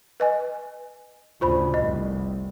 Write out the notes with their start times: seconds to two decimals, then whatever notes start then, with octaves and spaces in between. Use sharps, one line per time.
0.20 B4 D#5 G#5
1.41 D2 C#3 F4 C5 B5
1.74 F1 C2 D#5